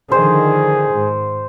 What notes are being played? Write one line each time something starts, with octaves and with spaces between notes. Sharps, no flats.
D3 D#3 F3 G#4 C5
G#2